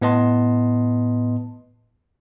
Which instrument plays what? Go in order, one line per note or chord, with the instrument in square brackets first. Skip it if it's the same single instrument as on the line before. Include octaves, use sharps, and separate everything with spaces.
[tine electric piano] A2 B3 B4 D#5 A5 C6